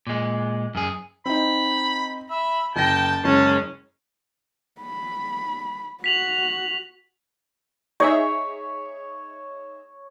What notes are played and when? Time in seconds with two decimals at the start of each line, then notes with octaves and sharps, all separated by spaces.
0.07 A#2 G#3
0.75 F#2 G#4
1.26 C4 D#4 B5
2.30 E5 B5
2.76 F#1 G5 A5 A#6
3.24 F#1 G#3 C#4 A5
4.82 B5
6.04 F#4 B6 F7 F#7
8.00 D#4 G#4 C#5 E5